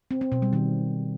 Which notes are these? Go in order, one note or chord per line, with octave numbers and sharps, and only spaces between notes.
C4
C4
B2
G3
D#3